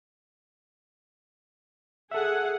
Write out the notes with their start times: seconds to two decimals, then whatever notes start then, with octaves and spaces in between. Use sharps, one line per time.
2.11 G#4 A4 E5 F#5